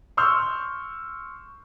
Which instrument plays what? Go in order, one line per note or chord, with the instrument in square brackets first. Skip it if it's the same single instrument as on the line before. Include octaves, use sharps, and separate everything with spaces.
[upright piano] C6 C#6 E6 F6 G6